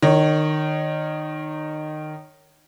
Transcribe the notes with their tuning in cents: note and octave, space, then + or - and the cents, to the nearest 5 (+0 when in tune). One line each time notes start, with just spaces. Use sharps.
D#3 -20 C#5 +0